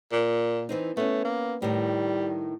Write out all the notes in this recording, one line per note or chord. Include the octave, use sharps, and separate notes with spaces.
A#2
E3 C4 D#4
A3 B3 C#4
A#3
A2 D#3 G3